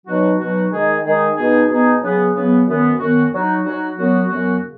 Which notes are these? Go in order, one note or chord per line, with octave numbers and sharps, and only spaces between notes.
B2 F#3 D#4 F#4
B2 F#3 D#4 F#4
D#3 G#3 D#4 G#4
D#3 G#3 D#4 G#4
B2 B3 D#4 G#4
B2 B3 D#4 G#4
C#3 F#3 B3
C#3 F#3 B3
F#2 D#3 B3 F#4
F#2 D#3 B3 F#4
F#3 D#4 F#4
F#3 D#4 F#4
F#2 F#3 B3 F#4
F#2 F#3 B3 F#4
C#3